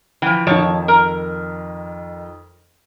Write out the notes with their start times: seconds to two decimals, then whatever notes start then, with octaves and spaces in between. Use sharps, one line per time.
0.22 E3 F3 G5
0.47 F2 D#3 F3 C#5 A5
0.88 A#4